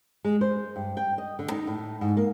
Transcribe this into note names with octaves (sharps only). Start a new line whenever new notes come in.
G#3
C5
G2
G5
D#5
D3
D#4
A2
G#2
A#3